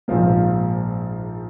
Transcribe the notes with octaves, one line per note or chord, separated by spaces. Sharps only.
A#1 G#2 F3 A#3